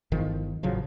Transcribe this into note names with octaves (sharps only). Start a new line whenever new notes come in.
G1 E2 D#3 F3
A1 C#3 F3 F#3